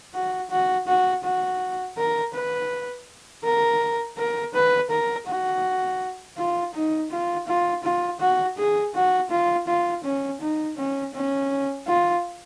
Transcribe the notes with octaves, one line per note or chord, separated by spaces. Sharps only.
F#4
F#4
F#4
F#4
A#4
B4
A#4
A#4
B4
A#4
F#4
F4
D#4
F4
F4
F4
F#4
G#4
F#4
F4
F4
C#4
D#4
C#4
C#4
F4